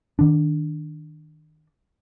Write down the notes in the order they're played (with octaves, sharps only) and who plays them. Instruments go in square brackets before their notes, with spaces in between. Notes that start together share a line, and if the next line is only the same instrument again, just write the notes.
[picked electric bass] D#3 D4